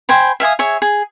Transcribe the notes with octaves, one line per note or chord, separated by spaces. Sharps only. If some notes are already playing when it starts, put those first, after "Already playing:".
C5 G5 G#5 B5
E5 F5 G#5 D#6
G#4 C#5 E5
G#4